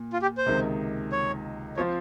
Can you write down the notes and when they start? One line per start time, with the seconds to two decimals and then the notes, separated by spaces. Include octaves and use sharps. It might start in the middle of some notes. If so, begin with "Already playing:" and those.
Already playing: A#2
0.13 F4
0.22 G4
0.38 C5
0.46 C#2 C3 D#3
1.12 C#5
1.77 F3 C4 F4 C#5